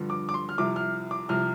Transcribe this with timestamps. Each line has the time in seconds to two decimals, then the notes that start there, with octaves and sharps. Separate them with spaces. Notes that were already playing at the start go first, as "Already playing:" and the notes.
Already playing: G2 D3 F3
0.10 D6
0.29 D6
0.34 C6
0.49 F6
0.58 C2 C3 F3 D6
0.76 F6
1.11 D6
1.29 C2 C3 F3 F6